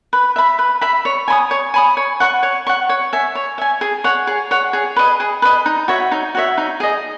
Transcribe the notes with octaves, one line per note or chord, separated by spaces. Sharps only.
B4
E5 B5
B4
E5 B5
C#5
G#5 B5 D#6
C#5
G#5 B5 D#6
C#5
F#5 C#6
C#5
F#5 C#6
C#5
E5 G#5
C#5
E5 G#5
G#4
C#5 F#5
G#4
C#5 F#5
G#4
B4 D#5
G#4
B4 D#5
D#4
F#4 C#5 E5
D#4
F#4 C#5 E5
D#4
G#4 D#5